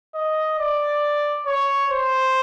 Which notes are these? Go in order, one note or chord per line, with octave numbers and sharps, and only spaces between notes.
D#5
D5
C#5
C5